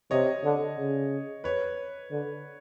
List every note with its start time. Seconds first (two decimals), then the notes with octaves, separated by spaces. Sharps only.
0.11 C3 C#5 D#5
0.44 D3
0.78 C#3
1.44 B4 C#5
2.11 D3